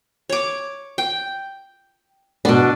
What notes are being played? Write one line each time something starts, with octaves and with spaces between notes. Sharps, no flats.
C#5 D6
G5
B2 B3 D4